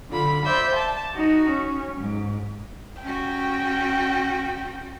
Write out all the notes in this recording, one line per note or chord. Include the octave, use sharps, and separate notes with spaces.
D3 F4 B5
C5 D5 E5 G6
A5
D#4 F#4
C#4
G#2
C#4 F#4 G5